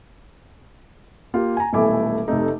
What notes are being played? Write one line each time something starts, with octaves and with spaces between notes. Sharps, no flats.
A#3 F4 G4
G#5 A#5
D#1 B1 A3 E4 G#5 D6
F1 C3 A3 D#4